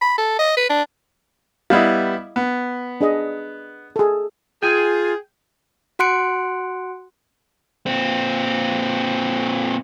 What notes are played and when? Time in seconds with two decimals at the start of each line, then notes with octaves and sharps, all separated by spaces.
0.01 B5
0.18 A4
0.39 D#5
0.57 B4
0.69 D4
1.70 G3 B3 E4 D#5 F5
2.36 B3
3.01 D4 G#4 D#5
3.96 G#4 A4
4.63 F4 G#4 G5 G#5
5.99 F#4 F#5 C6 F#6 C#7 D7
7.86 A#2 C4